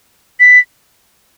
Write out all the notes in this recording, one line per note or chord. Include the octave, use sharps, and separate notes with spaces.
B6